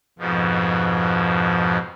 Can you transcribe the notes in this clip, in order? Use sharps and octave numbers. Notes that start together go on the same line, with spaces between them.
F2 G#2 B2 F3